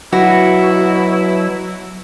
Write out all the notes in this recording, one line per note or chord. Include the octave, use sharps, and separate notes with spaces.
B2 F#3 E4 F#4